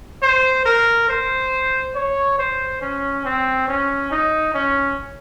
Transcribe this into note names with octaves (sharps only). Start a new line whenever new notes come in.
C5
A#4
C5
C#5
C5
C#4
C4
C#4
D#4
C#4